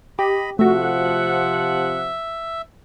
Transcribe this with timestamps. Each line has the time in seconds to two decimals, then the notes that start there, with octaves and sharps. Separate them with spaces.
0.19 G4 D#5 B5
0.59 C3 F3 A3 F#4 E5 F#5